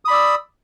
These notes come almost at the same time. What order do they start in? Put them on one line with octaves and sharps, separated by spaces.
D#6 B5 D5 E6